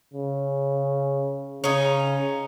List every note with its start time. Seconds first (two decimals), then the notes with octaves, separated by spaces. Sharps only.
0.13 C#3
1.64 C#3 C#4 D#4